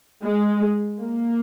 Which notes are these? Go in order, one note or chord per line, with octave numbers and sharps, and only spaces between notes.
G#3
A#3